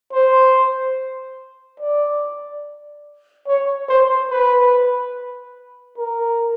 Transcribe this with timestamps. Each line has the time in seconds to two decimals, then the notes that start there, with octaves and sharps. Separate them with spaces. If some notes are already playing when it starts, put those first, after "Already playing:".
0.12 C5
1.80 D5
3.47 C#5
3.89 C5
4.31 B4
5.98 A#4